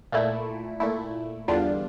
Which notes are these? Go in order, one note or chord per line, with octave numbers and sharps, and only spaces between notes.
A#2 A3 E4
A#2 A3 E4
E2 D3 G3 D4 F4